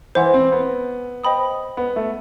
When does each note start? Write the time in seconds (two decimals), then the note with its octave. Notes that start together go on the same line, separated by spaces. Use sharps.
0.15 E3 C5 F#5 C6
0.34 C4
0.52 B3
1.24 C5 D#5 G5 B5 D#6
1.77 B3
1.96 A3